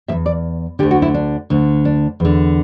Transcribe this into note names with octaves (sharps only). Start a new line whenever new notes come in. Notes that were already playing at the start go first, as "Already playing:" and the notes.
B2 E5
E2
D5
D2 D3 G4
F#4
E4
D4
D2 D3
D4
E2 D3